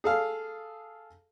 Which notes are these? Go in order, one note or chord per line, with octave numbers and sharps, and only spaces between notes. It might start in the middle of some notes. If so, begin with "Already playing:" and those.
G#4 A4 F5